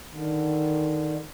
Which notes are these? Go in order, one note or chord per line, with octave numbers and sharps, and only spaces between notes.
D3 D#3